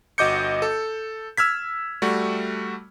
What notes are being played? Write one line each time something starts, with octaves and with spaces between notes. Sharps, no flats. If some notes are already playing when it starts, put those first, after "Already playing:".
G1 F#4 D#5 D6 G6 C#7
A4
E6 F6 G#6 B6
G3 A3 F#4